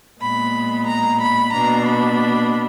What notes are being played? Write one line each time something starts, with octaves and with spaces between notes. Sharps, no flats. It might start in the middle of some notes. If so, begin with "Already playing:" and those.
A#2 G#3 B3 B5
A#5
B5
B2 A#3 D4 A#5
B5